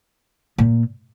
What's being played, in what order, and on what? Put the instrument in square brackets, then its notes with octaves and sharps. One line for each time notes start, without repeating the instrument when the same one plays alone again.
[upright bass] A#2